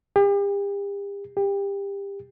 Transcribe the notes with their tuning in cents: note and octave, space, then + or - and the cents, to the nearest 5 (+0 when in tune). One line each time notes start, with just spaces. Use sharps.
G4 +40
G4 +25